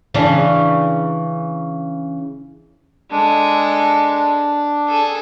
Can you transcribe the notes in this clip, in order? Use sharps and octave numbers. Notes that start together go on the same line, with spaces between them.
C#3 E3 D4
G#3 D4 A4
G#4 A4